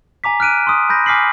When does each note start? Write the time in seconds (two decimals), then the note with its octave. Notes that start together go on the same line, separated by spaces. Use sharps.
0.24 G#5 A#5 D6 B6
0.40 F6 F#6 D7 D#7
0.67 C6 D#6
0.89 B5 G6 A#6
1.06 G#5 D6 F6 B6 C7 F#7